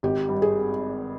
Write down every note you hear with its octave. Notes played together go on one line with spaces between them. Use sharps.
G#1 G4
G2
G#4